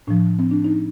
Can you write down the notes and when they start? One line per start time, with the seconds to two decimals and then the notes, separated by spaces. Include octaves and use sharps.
0.07 A2 F3 D4
0.39 C4
0.51 D4
0.64 D#4